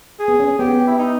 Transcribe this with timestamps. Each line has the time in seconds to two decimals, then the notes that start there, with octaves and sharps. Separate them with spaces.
0.20 G#4
0.28 B3
0.40 C#4
0.59 B3 G4
0.87 E4
0.98 D#4